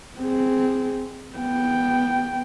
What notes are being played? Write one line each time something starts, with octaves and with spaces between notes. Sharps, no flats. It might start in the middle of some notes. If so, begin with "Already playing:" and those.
C4 G#4
B3 G5